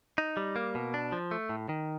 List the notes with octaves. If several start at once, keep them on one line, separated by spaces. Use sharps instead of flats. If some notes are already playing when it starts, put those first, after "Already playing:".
D#4
G3
A#3
B2
D4
F3
A3
A2
D#3